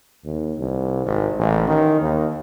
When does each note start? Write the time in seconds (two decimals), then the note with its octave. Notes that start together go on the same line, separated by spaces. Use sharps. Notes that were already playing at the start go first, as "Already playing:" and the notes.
0.25 D#2
0.58 C2
1.06 G#1
1.39 A1
1.68 D#3
2.01 D#2